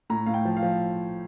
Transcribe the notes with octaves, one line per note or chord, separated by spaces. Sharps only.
A2 A#5
A2 F5
G5
F3
F5
F3